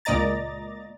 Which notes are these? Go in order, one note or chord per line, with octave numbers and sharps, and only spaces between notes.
C#2 A#2 D5 D#5 A#5 A6